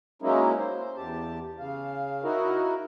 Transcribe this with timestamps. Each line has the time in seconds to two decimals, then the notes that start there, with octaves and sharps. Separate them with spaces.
0.22 F#3 G#3 A#3 C#4 D#4 E4
0.58 C5
0.97 E2 G4 A5
1.59 C#3 F5
2.24 D#4 E4 F#4 A#4